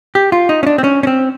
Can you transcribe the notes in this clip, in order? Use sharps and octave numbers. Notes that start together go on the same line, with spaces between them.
G4
F4
D#4
C#4
D4
C4
C#4
C#4
C4